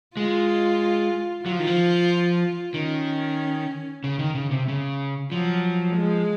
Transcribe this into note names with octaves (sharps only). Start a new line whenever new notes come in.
G#3 F4
F#3 F4
F3
D#3
F3
D#3 C#4
C#3
D#3
C#3
C3
C#3
F3 F#3
G#3